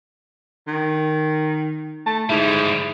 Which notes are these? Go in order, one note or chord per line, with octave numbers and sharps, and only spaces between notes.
D#3
A3 A5
G#2 D3 G3 E4